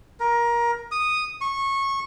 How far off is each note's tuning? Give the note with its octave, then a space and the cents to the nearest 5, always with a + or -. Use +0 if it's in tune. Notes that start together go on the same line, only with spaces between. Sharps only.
A#4 +20
D#6 -5
C#6 -20